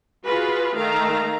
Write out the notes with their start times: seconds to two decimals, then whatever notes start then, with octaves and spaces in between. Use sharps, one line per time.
0.25 F4 F#4 G#4 B4
0.76 D#3 A3 F5 A#5